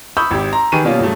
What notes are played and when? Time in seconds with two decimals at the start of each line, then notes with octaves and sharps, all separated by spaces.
0.17 B5 C#6 D#6 E6 G6
0.31 G#1 G4
0.52 A#5 C6
0.72 D#3 G4 G#4 B4 C#6 D#7
0.84 B2 G3 A#3 C#4 F4
0.99 G2 C#3 F#3 A3